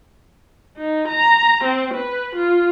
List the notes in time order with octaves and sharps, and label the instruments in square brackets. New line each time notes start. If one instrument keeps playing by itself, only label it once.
[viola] D#4
A#5
C4
B4
F4